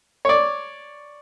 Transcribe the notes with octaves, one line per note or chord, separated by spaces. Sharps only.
C#5 D5